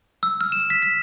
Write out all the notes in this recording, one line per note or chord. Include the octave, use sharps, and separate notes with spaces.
E6
F6
E7
B6
B6